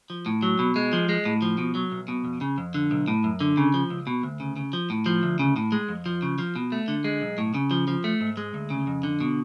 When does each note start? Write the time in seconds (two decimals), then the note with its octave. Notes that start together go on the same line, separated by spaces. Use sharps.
0.10 F3
0.26 A2
0.43 F#3
0.59 B2
0.76 G#3
0.93 F3
1.09 G#3
1.25 A2
1.42 F3
1.58 B2
1.75 F#3
1.92 B1
2.08 B2
2.25 F2
2.41 C#3
2.58 F2
2.74 D3
2.91 B1
3.08 A2
3.24 F#2
3.40 D3
3.57 C#3
3.74 F3
3.90 C#2
4.07 B2
4.23 D2
4.40 C#3
4.57 C#3
4.73 F3
4.90 A2
5.06 F3
5.23 D2
5.39 C#3
5.56 A2
5.72 G#3
5.89 F2
6.06 F3
6.22 C#3
6.38 F3
6.56 B2
6.72 A3
6.88 D3
7.04 G#3
7.22 B1
7.38 A2
7.54 C#3
7.71 F3
7.88 F3
8.04 A3
8.21 G#2
8.37 G#3
8.54 D2
8.70 C#3
8.87 F2
9.03 D3
9.20 B2